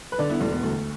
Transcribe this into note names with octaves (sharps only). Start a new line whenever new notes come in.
B4
D3 A4 D5
B3 E4
E1 A3 D4
B3
D2 A3